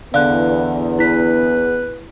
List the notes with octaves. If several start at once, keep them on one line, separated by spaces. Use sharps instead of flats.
E2 D3 B3 F5 F#6
E4 B4 B6